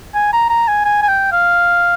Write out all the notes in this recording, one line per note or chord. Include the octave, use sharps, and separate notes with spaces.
G#5
A#5
A#5
G#5
G#5
G#5
G5
F5